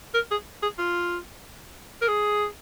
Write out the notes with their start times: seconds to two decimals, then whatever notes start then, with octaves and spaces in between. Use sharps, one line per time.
0.14 A#4
0.31 G#4
0.62 G#4
0.78 F4
2.02 A#4
2.07 G#4